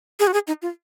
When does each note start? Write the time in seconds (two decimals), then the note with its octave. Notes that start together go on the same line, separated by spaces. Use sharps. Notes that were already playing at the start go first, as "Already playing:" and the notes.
0.19 G#4
0.27 F#4
0.33 G#4
0.47 D#4
0.62 F4